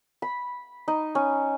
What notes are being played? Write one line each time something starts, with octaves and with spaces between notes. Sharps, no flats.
B5
D#4
C#4